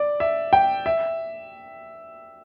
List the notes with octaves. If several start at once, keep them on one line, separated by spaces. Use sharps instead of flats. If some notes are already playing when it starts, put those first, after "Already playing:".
Already playing: D5
E5
G5
E5